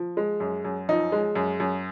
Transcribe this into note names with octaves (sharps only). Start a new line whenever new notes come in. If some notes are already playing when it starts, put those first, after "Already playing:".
Already playing: F3
G#3
F#2
F#2
F3 D#4
G#3
F#2
F#2